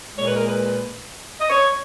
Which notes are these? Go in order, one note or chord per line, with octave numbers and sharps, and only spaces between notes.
A#2 G#3 C#5
B4
A#4
B4
D#5
C#5